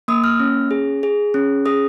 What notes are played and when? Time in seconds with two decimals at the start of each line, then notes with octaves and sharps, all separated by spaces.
0.08 A#3 D#6
0.24 F6
0.40 C#4
0.71 G#4
1.03 G#4
1.34 C#4
1.66 G#4 D#6